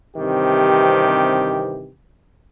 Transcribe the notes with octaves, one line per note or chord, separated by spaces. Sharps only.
G2 C3 D#3 E3 C4 G4